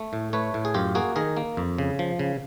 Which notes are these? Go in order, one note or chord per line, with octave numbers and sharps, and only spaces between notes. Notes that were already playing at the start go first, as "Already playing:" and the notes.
Already playing: A3
A2
A3 B4 C#5
A2
G#4
F#2 F4 G4
A#3 F#4 G#4
D#3 G#4 A#4
A#3
F2
C#3
F3
C#3